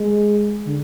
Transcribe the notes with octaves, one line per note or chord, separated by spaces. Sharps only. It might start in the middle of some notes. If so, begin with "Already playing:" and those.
Already playing: G#3
D3